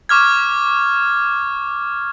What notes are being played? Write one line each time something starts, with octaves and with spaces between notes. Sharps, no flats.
C#6 D6 F6 G#6